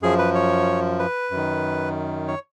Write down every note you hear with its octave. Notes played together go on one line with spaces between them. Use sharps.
F#2 F3 G#4
B4
C#5
B4
F#2 D#3
C#5